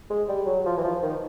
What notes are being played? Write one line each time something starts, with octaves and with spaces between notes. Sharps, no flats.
G#3
G3
F#3
F3
E3
F3
D#3